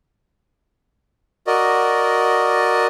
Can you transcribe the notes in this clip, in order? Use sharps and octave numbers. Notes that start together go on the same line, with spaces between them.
F#4 A#4 D5 D#5